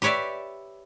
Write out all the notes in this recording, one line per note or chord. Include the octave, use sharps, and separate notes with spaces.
G4 B4 C#5 D5 E5